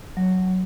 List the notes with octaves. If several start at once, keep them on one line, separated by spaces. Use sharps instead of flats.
F#3